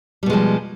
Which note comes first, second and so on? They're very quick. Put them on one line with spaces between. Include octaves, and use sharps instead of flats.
G3 B2 G#3 F3